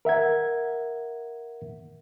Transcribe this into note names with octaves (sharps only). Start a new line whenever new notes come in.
A#4 E5 F#5 G#6